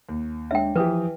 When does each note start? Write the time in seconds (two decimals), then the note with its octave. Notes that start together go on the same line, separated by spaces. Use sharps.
0.09 D#2
0.51 G#3 D4 C#5 E5 G5
0.76 E3 F3 G4 B4 D#6